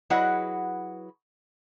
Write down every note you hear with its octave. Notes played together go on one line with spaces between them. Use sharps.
F#3 E4 G#4 B4 D#5 F#5